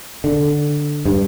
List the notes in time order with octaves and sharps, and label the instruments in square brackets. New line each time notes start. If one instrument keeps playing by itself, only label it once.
[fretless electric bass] D3
G2